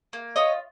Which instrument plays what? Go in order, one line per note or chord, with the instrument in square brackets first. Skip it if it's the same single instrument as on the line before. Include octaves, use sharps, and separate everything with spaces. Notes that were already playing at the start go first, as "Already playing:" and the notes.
[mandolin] A#3
F4 C#5 D#5